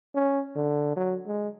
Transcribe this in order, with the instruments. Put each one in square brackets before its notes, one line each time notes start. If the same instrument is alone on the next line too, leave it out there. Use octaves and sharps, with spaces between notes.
[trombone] C#4
D3
F#3
G#3